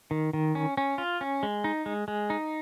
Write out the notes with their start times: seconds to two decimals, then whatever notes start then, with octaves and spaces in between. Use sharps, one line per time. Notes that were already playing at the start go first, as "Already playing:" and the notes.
0.11 D#3
0.33 D#3
0.55 C#4
0.77 C#4
0.98 F4
1.21 C#4
1.43 G#3
1.64 D#4
1.86 G#3
2.08 G#3
2.30 D#4